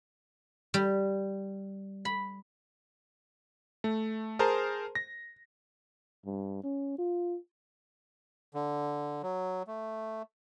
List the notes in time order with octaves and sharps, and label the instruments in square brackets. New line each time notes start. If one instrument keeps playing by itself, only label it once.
[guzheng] G3
B5
[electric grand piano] A3
G#4 A#4 C5 A5 A#5 C6
A#6
[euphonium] G2
C#4
F4
[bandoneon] D3
F#3
A3